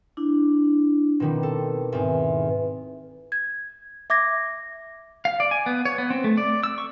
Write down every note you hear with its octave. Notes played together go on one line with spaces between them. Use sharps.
D4 E4
B2 D#3 G3 C4
A4
E2 G#2 C4
G#6
E5 D6 G#6 A#6
F5
D5
G#5
B3
C#5
B3
C4
A3
D5
E6
C#6